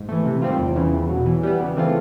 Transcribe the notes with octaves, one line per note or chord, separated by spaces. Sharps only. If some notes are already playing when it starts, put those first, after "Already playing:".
Already playing: G#2
E3 A3
C3
D#3 G3 C4 F4
E2
C#3 E3
E2
B2 F#3
E3
G3 B3
C#3
E3 A3 C4 F4